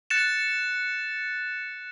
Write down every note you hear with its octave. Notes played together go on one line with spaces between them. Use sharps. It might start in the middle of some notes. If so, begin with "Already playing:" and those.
F#6 A6 C#7 E7